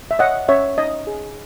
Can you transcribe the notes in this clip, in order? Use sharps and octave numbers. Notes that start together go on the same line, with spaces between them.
E5
C#5 D#5 F#5
C#4 C#5 E5
D#4 D#5
G#4